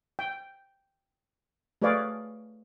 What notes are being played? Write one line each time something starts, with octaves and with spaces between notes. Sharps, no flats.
G5
A3 G#4 B4 C#5 D5 F5